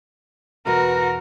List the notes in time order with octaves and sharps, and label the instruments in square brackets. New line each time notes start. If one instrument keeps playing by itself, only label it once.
[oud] E2 B2 B4 [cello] F#4 [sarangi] A#4